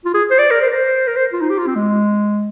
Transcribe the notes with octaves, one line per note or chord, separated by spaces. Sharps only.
F4
G#4
C5
D5
A#4
C5
A#4
C5
A#4
C5
F4
D#4
G4
F4
C4
G#3